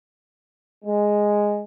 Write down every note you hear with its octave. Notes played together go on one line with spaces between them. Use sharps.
G#3